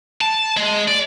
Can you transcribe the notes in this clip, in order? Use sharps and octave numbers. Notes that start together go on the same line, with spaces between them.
A5
G#3
D5